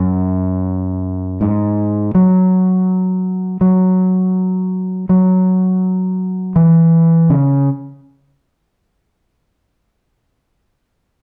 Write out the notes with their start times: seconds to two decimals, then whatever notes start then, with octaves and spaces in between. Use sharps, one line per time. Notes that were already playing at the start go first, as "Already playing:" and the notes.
Already playing: F#2
1.41 G#2
2.15 F#3
3.61 F#3
5.09 F#3
6.56 E3
7.30 C#3